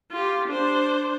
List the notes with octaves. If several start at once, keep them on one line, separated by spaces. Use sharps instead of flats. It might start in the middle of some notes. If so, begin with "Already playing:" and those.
F4 G4
D4 C5